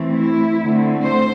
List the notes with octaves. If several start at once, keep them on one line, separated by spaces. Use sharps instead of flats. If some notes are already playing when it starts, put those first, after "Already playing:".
Already playing: E3 A3 C4
E4
D3 A3 C4
C5